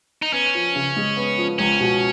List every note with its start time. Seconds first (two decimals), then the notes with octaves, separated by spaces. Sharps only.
0.22 D#4
0.33 B3 C#4
0.55 F3
0.76 C#3
0.97 G#3
1.17 B3
1.38 F3
1.59 C#2 C#4
1.80 B2